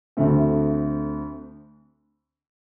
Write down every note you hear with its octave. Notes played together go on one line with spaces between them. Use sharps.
D2 D3 A3 C4